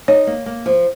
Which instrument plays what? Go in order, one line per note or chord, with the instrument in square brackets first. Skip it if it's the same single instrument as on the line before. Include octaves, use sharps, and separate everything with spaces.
[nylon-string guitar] D#4 [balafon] C#5
[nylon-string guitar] A#3
A#3
F3